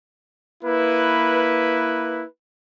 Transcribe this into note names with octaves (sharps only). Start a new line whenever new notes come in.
A#3 E4 B4